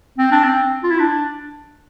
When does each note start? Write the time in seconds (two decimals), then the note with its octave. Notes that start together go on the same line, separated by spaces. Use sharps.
0.18 C4
0.32 D4
0.44 C4
0.83 F4
0.91 E4
1.00 D4